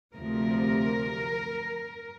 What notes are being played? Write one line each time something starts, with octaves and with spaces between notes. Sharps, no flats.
D2 C3 F3 A#4